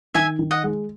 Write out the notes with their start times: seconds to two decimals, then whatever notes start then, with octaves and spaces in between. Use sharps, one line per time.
0.14 D#3 E5 G#5
0.39 D#3
0.51 D#5 F#5
0.64 G#3